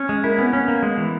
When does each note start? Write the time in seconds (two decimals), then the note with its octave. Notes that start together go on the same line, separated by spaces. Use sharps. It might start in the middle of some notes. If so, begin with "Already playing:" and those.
Already playing: C#4
0.09 G#3
0.23 A#3 E4
0.38 B3 C#4
0.53 C#4
0.68 A#3
0.83 G#3
0.98 E3